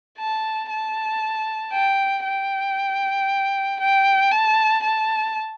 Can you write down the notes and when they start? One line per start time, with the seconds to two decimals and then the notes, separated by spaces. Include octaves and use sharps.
0.18 A5
0.70 A5
1.73 G5
2.24 G5
3.80 G5
4.31 A5
4.83 A5